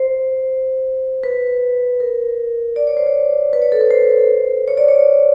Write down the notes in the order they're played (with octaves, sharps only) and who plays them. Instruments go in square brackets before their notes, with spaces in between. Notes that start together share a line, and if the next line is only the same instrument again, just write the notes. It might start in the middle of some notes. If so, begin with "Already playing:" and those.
Already playing: [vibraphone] C5
B4
A#4
D5
C#5
C5
C#5
B4
C#5
A4
B4
C5
C#5
D5
C#5